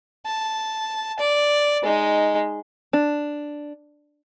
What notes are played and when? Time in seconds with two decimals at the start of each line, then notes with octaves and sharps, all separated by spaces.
0.26 A5
1.20 D5
1.83 G#3 D#4
2.93 D4